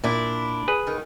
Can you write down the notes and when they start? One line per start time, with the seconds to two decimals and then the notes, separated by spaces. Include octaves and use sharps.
0.04 A#2 D4 E4
0.68 G#4 B4
0.87 D#3